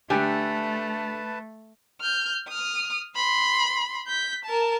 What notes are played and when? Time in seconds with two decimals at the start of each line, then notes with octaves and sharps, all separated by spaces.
0.10 D3 A3 D4 G4 B4 G#5 A5
2.01 F6 G6
2.49 D#6 F6
3.16 B5 C6
4.07 G6 B6
4.44 A#4 A5